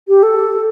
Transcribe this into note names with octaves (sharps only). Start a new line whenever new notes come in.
G4
A4